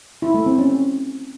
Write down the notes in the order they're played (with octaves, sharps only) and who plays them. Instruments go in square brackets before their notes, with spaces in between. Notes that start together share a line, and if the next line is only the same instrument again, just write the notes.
[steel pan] E4
A3
C4
C#4